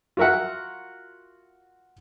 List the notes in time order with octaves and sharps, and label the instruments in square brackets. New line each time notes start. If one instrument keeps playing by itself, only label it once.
[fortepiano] F4 F#4 A#4 E5 F#5